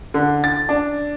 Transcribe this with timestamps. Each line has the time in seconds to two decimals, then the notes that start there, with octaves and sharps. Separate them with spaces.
0.14 D3
0.44 A6
0.69 D4